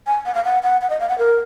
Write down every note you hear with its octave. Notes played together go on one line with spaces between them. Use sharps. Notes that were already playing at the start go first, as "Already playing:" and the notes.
G#5
F#5
F5
F#5
F#5
F#5
D#5
F5
F#5
A#4